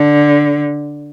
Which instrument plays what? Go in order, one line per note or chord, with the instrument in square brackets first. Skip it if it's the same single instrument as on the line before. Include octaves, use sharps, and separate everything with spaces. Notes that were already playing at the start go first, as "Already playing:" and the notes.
Already playing: [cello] D3